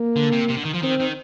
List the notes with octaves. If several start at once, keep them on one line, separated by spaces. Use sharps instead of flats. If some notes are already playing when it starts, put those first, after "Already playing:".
Already playing: A#3
D3
C3
C3
D3
D#3
F3
D#3 C4
D#3